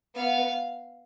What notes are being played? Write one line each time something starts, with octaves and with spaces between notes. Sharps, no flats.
B3 F5